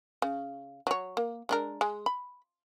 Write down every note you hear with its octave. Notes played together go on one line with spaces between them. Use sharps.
C#3
F#3 C#5
A#3
G#3 D4 A#4
G#3
B5